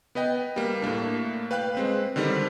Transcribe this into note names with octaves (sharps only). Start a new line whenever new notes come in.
B3 B4 D#5 G5
G3 A#3
A2 A3 A#3 D4
B4 F5 G5 F#6
G#3 C4 B4
D3 D#3 G3 C4 D4